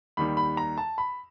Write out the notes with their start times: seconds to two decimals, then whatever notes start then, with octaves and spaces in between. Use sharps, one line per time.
0.17 D#2 D#3 G3 B5
0.37 B5
0.57 A#5
0.78 A5
0.98 B5